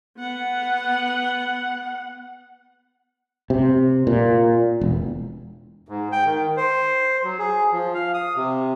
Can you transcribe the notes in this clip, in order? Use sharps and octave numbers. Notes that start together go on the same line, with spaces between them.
B3 F#5
C3
A#2
E1
G#2
G5
D#3
C5
F#3
G#4
F3
F5
D#6
C3